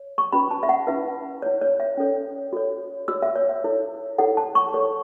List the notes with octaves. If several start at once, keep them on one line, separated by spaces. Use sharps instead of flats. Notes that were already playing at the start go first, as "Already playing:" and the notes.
Already playing: C#5
C#6
C#4 F#4 B4 B5
A5
E5
F#5
C#4 E4 B4 E5
E4 C#5
C#5
E5
C#4 A4 C#5
F#4 A4 C#5
F#4 C#5 E6
E5
C#5
E5
E4 A4 C#5
E4 A4 C#5 F#5
A5
C#6
E4 A4 C#5